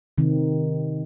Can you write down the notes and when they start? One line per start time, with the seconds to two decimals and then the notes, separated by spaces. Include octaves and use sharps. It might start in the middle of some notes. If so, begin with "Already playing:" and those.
0.18 C3 D#3 C4